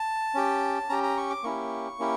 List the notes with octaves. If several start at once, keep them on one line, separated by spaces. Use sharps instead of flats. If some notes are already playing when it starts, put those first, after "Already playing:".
Already playing: A5
C#4 G4
C#4 G4 A#5
A#5
C#6
D6
A#3 C#4 E4 G4 C#6
A#3 C#4 E4 G4